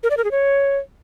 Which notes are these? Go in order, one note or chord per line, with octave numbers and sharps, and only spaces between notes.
A#4
D5
A#4
G#4
C#5